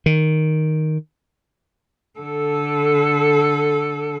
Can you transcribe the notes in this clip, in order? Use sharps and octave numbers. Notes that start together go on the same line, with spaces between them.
D#3
D3 A4